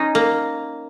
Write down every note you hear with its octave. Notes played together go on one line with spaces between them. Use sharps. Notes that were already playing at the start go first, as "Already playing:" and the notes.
Already playing: C#4 D#4
A#3